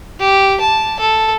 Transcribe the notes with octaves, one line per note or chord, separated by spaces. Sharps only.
G4
A5
A4